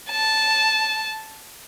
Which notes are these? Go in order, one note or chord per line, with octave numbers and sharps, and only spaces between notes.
A5